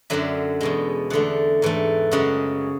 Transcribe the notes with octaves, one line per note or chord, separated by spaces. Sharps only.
F#2 D3 F#3 E5
E2 B2 G#3
E2 D3 A3 F#5
G#2 E3 A3
F#2 C#3 G#3 F#5